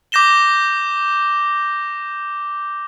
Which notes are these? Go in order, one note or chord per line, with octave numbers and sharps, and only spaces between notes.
D6 G6 A#6 E7 G7